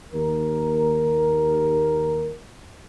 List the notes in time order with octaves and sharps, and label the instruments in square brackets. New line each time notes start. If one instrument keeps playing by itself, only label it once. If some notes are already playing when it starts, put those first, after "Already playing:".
[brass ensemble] D#2 A#4